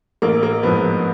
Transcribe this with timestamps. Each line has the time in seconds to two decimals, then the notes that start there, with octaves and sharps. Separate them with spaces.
0.22 A1 A#3
0.43 A#3
0.63 G#2 F3 B3